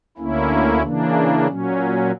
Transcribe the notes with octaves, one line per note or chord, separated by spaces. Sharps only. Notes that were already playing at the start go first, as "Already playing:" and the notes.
D2 D3 A#3 C#4 E4
C#3 E3 A#3 D4
A#2 F#3 C#4